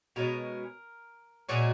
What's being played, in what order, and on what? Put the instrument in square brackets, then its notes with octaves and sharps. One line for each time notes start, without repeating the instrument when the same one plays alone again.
[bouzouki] B2 G#3 C#4 A#4
A#2 G#3 C#4 F#4